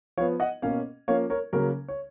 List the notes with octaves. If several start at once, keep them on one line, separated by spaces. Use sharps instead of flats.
F3 B3 C#5 F5
D#5 F#5
B2 A#3 C#4 C#5 F5
F3 A#3 C#4 C#5 F5
A#4 C#5
C#3 F#3 A#3 C#4 A#4
C#5